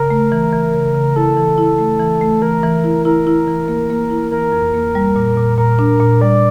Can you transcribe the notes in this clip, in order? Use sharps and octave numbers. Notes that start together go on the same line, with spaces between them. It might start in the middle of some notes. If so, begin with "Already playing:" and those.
Already playing: C#3 A#4
A3
E3
E3
C#3
C#3
E4 A4
E3
E4
A3
E3
A3
E3 A#4
E3
E4
E4 A#4
E4
E3
A#3
A#3
E4
E3 A#4
F2
A#3
G3
A#2
A#2
A#2 A#4
D4
A#2
G3 D5